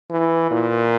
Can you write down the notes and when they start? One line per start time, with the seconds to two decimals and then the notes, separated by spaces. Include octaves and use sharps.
0.11 E3
0.51 A#2